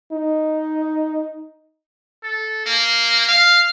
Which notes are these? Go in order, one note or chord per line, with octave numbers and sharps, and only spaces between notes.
D#4
A4
A#3
F5